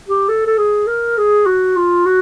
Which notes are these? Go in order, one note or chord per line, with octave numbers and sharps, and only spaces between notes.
G4
A4
A4
G#4
A#4
G#4
F#4
F4
F#4